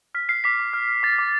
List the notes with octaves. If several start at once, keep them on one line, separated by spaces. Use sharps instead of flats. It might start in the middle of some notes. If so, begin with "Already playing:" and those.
F6 B6
F6 C7
D6 B6
D6
F6
F6
D6 A6
D6